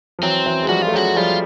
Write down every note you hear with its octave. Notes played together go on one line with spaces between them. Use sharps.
F3
E3 F#3 C4
E3 F#3
G#3
F3 G3 F#4
F4
A3
F#3 G#3 F#4
F3 G3 F4